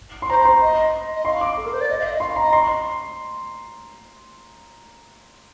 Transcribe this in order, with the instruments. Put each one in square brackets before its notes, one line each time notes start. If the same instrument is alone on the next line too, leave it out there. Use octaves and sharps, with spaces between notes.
[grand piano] C6
[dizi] C5 [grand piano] A#5
[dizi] C5
[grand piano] C6
[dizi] D#5
D#5
[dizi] F5 [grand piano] C6
[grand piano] D6
[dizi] A4
A#4
C5
D5
D#5
F5
D#5
[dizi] F5 [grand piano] C6
[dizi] F5
[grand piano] A#5
[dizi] D#5
[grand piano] C6